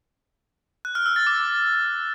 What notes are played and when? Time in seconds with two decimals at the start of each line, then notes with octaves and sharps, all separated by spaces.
0.85 F#6
0.95 F6
1.06 E6
1.16 A6
1.27 D6